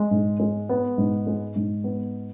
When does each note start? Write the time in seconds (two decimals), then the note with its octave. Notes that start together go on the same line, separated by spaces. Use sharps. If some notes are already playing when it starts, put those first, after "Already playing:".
Already playing: G#3
0.11 G#2
0.40 G#3
0.69 B3
0.98 G#2
1.27 G#3
1.56 G#2
1.84 B3